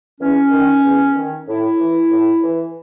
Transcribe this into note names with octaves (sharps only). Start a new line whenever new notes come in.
E2 C#4
D#3
E2
D#3
A2 E4
E3
A2
E3